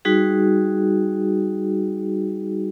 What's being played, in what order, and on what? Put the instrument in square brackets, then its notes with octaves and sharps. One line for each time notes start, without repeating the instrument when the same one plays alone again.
[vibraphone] G3 D#4 F#4 G#4